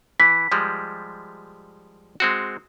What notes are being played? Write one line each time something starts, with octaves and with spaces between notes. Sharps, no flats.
E3 B6
F3 G3 G#3
G#3 C4 F#4